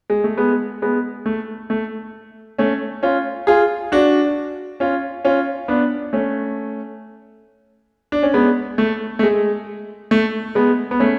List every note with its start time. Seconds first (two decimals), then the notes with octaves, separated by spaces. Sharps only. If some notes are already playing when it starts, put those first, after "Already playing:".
0.10 G#3
0.24 A3
0.37 G#3 B3
0.82 G#3 B3
1.26 A3
1.70 A3
2.59 A3 C#4
3.03 C#4 F4
3.47 F4 G#4
3.92 D4 F#4
4.80 C#4 F4
5.25 C#4 F4
5.68 B3 D4
6.13 A3 C#4
8.12 D4
8.23 C#4
8.34 G#3 B3
8.78 A3
9.19 A3
9.23 G#3
10.11 A3
10.55 G#3 B3
10.91 B3
11.00 A3 C#4